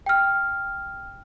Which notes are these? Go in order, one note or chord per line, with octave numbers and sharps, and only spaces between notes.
G5 F6